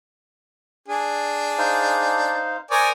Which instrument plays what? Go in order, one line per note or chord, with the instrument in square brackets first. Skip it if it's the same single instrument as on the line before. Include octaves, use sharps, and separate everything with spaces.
[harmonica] D4 G#4
[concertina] D#4 C5 F5
[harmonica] A#4 D5 G#5 [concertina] C5 C#6 D#6